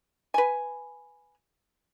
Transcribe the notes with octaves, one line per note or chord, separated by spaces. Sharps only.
B4 G#5